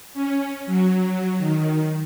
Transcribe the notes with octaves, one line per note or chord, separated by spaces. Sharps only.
C#4
F#3
D#3